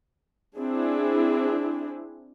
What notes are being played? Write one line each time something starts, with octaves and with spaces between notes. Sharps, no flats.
C4 D4 E4 G#4